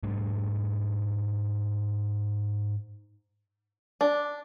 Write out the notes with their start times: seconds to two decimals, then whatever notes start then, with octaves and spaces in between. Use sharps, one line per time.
0.03 G#2 G3 A3 D4
4.01 D4